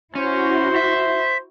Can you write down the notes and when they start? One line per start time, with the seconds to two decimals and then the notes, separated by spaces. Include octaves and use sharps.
0.15 C#4 E4 F#4 C5
0.76 E5